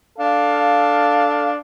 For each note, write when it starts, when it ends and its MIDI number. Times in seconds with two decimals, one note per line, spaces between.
0.19 1.55 62
0.19 1.55 69
0.19 1.55 77